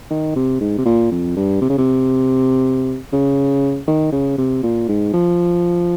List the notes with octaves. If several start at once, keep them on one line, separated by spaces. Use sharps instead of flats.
D#3
C3
G#2
C3
A#2
F2
G2
C3
C#3
C3
C#3
D#3
C#3
C3
A#2
G#2
F3